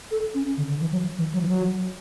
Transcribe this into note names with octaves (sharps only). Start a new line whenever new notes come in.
A4
C#4
D3
D3
E3
F#3
E3
F#3
E3
F#3